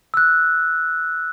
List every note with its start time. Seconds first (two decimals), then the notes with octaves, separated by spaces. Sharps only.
0.14 E6 F#6